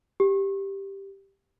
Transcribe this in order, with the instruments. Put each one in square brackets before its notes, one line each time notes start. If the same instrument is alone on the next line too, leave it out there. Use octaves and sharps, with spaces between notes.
[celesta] G4